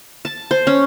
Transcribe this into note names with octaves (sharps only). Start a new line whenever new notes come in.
A5
C5
C#4